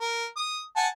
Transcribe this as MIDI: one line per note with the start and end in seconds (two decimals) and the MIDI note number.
0.01 0.26 70
0.37 0.61 87
0.76 0.87 78
0.76 0.87 80
0.76 0.87 81